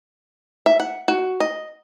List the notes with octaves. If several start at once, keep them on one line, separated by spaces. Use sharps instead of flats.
E5
F#5
F#4
D#5